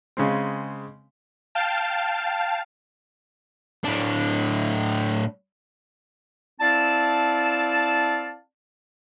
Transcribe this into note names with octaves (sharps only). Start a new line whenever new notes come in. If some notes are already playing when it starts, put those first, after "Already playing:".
C#3 G#3 C4
F5 G5 A5
A2 D4
C4 E4 D5 F5 A5